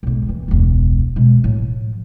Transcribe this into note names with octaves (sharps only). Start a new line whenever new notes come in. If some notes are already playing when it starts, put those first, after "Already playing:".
B1 G#2
D#3 E3
E1 C#2
B2 G#3
A2 F3